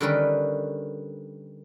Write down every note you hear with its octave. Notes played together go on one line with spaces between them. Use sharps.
D3 D#3 G3 C#4 A#4 B4